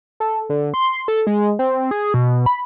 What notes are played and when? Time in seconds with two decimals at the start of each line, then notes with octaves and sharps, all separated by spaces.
0.20 A4
0.50 D3
0.74 C6
1.08 A4
1.27 G#3
1.59 C4
1.91 G#4
2.14 B2
2.46 B5